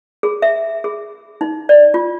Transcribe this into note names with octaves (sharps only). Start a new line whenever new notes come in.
G#4
E5
G#4
D#4
D5
F4